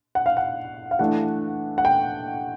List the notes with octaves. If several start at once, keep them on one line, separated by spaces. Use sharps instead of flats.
F#5
F5
F#5
F5
E3 A3 D4 F#5
F#5
G5